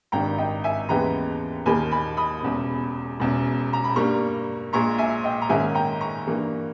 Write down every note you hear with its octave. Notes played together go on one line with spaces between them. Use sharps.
G#1 G2 D#3 G5 A#5
D#5 G5
E5 G#5
D#2 C#3 E3 G#3 B3 G5 A#5
D#2 D#3 A#3 G#5 B5
G#5 B5
B5 D#6
E1 E2 C#3
E1 E2 C#3
A#5
B5
G2 G3 A#3 A#5 C#6
A#1 A#2 G#3 A#5 C#6
E5 G#5
D#5 G5
A#5
G#2 D#3 A#3 C#4 E5 G#5
G5 A#5
A#5 C#6
G2 E3 A#3